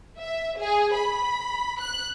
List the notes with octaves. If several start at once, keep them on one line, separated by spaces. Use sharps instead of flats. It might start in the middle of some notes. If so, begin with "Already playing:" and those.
E5
G#4
B5
F#6